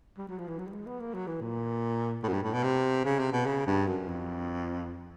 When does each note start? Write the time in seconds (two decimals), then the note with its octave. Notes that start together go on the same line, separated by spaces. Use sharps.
0.18 G3
0.28 F#3
0.38 F3
0.48 E3
0.59 F#3
0.67 G3
0.72 G#3
0.86 B3
1.00 A#3
1.14 F#3
1.27 E3
1.41 A#2
2.23 A2
2.28 F#2
2.33 G2
2.43 A2
2.53 B2
2.63 C3
3.05 C#3
3.19 C3
3.32 B2
3.45 C#3
3.66 G2
3.87 F#2
4.08 F2